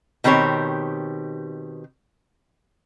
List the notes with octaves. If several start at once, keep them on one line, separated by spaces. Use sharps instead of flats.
B2 D#3 C4 G4 C#5